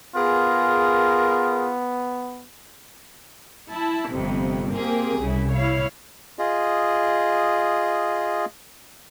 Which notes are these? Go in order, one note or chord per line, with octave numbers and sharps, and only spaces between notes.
B3 F4 G#4 A#4
E4 A5
G1 F2 C3
A#3 C4 G4 G#4
C2 C#3 E4
E4 C#5 F5
F4 G#4 D#5